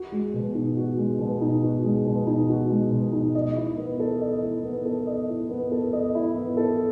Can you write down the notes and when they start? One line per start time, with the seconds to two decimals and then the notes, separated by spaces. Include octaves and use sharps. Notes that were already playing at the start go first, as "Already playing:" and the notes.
Already playing: F#4
0.12 G#3
0.34 B2
0.54 D#4
0.77 F#4
0.97 G#3
1.19 B2
1.41 D#4
1.63 F#4
1.84 G#3
2.06 B2
2.27 D#4
2.49 F#4
2.70 G#3
2.91 B2
3.13 D#4
3.35 D#5
3.57 E4
3.77 B3
4.00 A4
4.21 D#5
4.43 E4
4.64 B3
4.85 A4
5.07 D#5
5.29 E4
5.49 B3
5.72 A4
5.93 D#5
6.15 E4
6.36 B3
6.57 A4